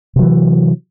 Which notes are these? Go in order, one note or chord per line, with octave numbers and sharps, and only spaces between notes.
C3 E3 F#3